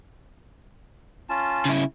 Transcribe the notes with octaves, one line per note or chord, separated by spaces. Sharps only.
C#4 F4 A5
C#3 E4